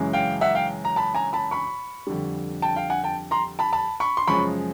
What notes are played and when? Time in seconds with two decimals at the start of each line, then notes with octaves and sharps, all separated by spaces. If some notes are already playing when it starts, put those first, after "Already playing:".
Already playing: F#2 C#3 E3 G#3
0.13 F5 G5
0.41 E5 F#5
0.55 F5 G5
0.85 A#5
0.96 A5 B5
1.15 G#5 A#5
1.33 A5 B5
1.51 B5 C#6
2.07 F2 D3 G3
2.62 G5 A5
2.76 F5 G5
2.90 F#5 G#5
3.04 G5 A5
3.31 A#5 C6
3.59 A5 B5
3.73 A5 B5
4.00 B5 C#6
4.17 C6
4.27 F#2 C#3 F3 G#3 B5 C#6